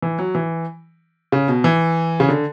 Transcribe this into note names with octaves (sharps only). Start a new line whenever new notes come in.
E3
F#3
E3
C#3
B2
E3
C#3
D3